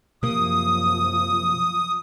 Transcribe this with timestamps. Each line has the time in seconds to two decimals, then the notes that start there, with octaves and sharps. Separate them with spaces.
0.23 F#2 C3 F3 A#3 D#6